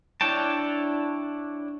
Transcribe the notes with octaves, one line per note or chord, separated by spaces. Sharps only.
D4 E4 C#5 G5 A5